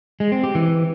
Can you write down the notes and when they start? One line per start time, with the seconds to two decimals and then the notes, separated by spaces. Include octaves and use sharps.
0.20 G#3
0.32 C4
0.43 G4
0.55 E3